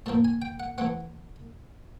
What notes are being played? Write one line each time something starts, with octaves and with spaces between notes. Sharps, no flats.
A2 F3 A#3 A5
G#5
G5
F#5
E3 A3 C4 F#5